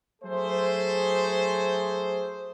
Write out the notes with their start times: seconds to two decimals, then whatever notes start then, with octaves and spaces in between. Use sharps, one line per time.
0.22 F#3 A3 G#4 C5